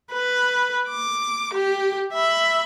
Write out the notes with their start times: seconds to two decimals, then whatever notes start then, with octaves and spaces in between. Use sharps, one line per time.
0.13 B4
0.90 D6
1.53 G4
2.13 E5 B5